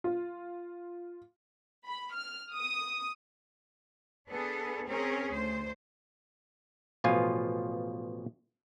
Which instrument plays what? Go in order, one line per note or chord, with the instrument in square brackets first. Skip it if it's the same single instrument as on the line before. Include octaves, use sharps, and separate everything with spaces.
[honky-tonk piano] F4
[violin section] B5
F6
D#6
[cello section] B3 D4 G#4 A4
C4 C#4 G#4 A#4
D2 C5
[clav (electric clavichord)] A1 B2 F3 F4 G#5